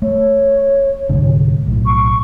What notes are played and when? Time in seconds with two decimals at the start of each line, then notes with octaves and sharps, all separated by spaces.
0.02 A3 C#5
1.09 C2 G#2 D3
1.67 B1 A2
1.85 C#6